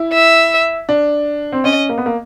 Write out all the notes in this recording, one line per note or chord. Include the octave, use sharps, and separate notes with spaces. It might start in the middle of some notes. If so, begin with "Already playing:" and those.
Already playing: E4
E5
D4
C4
C#4 D#5
A#3
B3
A#3